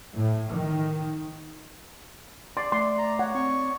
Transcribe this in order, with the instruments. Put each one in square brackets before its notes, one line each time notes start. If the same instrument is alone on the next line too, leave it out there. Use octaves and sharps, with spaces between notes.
[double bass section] A2
D#3
[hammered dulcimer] D5 [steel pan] C6
[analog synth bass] A3 [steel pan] C6
[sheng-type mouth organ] A#5
[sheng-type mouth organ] C#5 [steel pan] F#5
[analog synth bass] C4 [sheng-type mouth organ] C#5 C#6